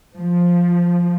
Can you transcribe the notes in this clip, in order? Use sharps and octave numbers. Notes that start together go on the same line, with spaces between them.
F3